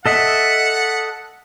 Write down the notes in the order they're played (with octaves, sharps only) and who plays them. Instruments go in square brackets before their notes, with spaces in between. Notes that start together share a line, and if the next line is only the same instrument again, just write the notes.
[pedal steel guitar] A4 D#5 E5 [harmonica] F#5